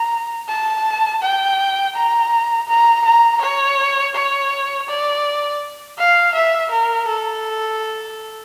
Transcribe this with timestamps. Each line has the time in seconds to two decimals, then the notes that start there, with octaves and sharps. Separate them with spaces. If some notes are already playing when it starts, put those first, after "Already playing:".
Already playing: A#5
0.49 A5
1.23 G5
1.96 A#5
2.69 A#5
3.06 A#5
3.42 C#5
4.15 C#5
4.89 D5
5.98 F5
6.35 E5
6.71 A#4
7.08 A4